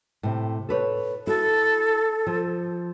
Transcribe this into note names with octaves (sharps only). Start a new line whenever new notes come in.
A2 C3
A4 B4 C#5
E4 F#4 A4
F3